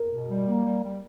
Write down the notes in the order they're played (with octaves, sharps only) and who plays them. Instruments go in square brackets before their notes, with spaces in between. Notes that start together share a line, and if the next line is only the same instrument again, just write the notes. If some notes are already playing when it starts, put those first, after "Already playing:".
Already playing: [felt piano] A#4
[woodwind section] B2
G3
A#3
G3
G3